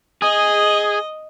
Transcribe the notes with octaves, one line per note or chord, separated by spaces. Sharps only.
G#4 D#5